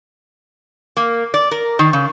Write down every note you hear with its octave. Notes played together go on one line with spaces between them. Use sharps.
A#3
D5
A#4
D#3
C#3